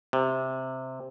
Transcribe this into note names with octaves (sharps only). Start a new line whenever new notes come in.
C3